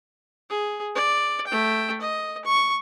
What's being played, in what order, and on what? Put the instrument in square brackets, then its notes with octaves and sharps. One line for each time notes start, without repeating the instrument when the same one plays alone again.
[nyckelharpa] G#4
D5
A3 G5
D#5
C#6